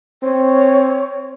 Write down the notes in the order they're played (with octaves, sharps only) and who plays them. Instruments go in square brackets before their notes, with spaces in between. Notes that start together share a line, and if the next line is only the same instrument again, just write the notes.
[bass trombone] C4 [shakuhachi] C#5